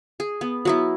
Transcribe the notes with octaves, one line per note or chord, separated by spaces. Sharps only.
G#4
B3
F#3 B3 E4